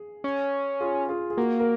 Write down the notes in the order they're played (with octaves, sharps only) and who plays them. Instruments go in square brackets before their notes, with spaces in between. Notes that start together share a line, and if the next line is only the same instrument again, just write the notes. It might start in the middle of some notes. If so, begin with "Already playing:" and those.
Already playing: [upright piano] G#4
[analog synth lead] C#4
[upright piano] F4 G#4
F4 G#4
G#4
[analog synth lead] A#3 [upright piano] F#4 A#4
[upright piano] A#4